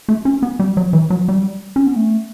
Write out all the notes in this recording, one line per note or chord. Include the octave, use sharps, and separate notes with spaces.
A3
C#4
B3
G3
F#3
E3
F#3
G3
C#4
B3
A3